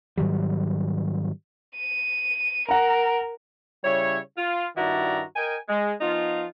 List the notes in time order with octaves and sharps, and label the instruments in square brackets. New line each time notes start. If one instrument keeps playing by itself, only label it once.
[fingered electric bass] G#2 D#3 F#3 G3
[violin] D#7
[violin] A#4 [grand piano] F#5 A#5
[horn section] C#3 G3 E4 C#5
F4
G2 D#3 E4 F#4 D5 A#5
A#4 D#5 G5 G#5
G#3
F3 B3 D#4 F4